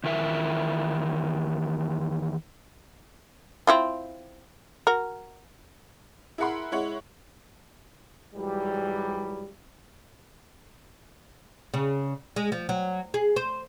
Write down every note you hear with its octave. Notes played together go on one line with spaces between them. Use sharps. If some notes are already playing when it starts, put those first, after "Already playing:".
E2 D#3 E4 A#4 E5
C4 E4 F4
F#4 A#4
E4 G#4 A#4 F#5 B5 C6
G#3 E4 C#5 F#5
G#2 E3 F#3 G3
C#3
G#3
F3
F#3
G#4
C5